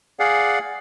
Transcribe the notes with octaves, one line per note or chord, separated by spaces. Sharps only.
G#4 D5 F5 F#5